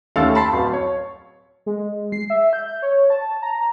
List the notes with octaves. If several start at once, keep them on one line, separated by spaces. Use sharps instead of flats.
D#2 A3 C#4 A4 F5 A6
A5 B5 C6 A6 C7
D1 F5
C#5
G#3
C7
E5
G6
C#5
A5
A#5